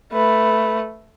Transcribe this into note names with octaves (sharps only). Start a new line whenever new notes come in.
A3 B4